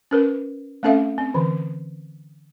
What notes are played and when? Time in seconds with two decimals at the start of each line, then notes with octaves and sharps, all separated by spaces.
0.11 C#4 A#4 B4
0.83 A3 C4 C#4 A4 E5 F5
1.18 C4
1.34 D3 E3